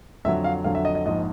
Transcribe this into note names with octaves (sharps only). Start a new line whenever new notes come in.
F2 D3 F#3 E5
F5
F2 D3 F#3 F5
E5
D#5
D#5
A#1 G#2 F3 D#5